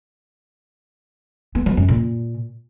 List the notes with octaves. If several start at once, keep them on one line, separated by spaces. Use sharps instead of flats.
B3
F#3
F#2
A#2